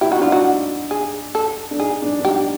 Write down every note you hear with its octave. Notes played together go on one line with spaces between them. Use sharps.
E4 G4
D#4 F#4
D4 F4
D#4 F#4
G#4
A4
D4
D#4 G#4
D4
D4
D#4 G4